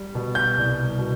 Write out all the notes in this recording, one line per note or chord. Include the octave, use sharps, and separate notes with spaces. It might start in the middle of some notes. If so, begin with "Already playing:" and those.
Already playing: G3
B2
G6
C2
B2